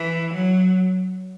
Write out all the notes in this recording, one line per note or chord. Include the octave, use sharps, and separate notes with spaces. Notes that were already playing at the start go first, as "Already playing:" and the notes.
Already playing: E3
F#3